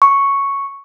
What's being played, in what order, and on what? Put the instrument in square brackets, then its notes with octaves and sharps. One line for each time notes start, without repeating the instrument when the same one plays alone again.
[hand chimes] C#6